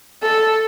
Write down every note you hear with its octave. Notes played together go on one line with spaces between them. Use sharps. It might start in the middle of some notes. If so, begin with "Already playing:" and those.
A4